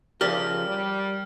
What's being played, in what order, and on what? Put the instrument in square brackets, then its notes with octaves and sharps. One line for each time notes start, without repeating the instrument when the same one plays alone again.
[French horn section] C#3 F3 [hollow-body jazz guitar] G4 A#4 D5 [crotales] F6
[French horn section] G3